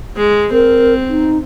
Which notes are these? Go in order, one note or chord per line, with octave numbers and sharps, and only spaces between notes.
G#3
C4 A#4
D#4